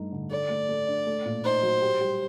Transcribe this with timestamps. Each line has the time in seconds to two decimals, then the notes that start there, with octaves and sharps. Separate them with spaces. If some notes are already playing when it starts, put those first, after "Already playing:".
Already playing: G2 A3 D#4
0.12 D3
0.31 A4 D5
0.49 A3
0.69 A3
0.87 D4
1.07 A3
1.25 A#2
1.44 D#4 C5
1.62 F#3
1.82 G4
2.01 G3